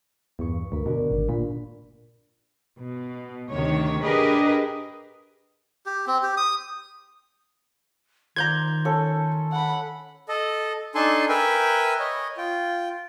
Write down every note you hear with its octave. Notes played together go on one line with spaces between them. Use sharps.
E2 G2 B3 C#6
D2 A#4 B5
B2 D3 A#4
G#1
A#2 B5
B2
D2 C3 D#3 C#5
D4 G4 G#4 A#4 B4 D#5
G4
C4
G4
D#6
D#3 C5 D5 F5 A#5 G6 G#6
C#4 A4
F#5 B5
A4 D#5
D4 D#4 A4 G#5 A5 C6
A#4 B4 E5 G5 G#5
C#5 D#5
F4 G5